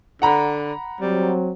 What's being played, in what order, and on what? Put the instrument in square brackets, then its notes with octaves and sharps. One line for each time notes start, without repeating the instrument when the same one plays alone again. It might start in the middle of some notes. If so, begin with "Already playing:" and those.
[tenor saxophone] D3 [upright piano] F#5 A#5 B5
[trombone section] F#3 C4 [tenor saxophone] G3